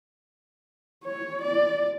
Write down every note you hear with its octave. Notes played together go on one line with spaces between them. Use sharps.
C#5
D5